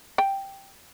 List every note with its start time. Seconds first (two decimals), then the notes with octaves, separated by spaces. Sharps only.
0.18 G5